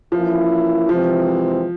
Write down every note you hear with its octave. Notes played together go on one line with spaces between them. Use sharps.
E3 F3 A#3 C#4 E4
C3 E3 F3 G#3 C4